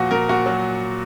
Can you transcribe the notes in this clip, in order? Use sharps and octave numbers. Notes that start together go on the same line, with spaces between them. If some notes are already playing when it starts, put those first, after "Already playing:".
Already playing: A#2 F3 F#4
A#2 A#4
A#2 F#4
F#3